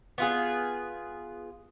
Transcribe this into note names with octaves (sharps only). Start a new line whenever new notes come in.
B3 F4 G#4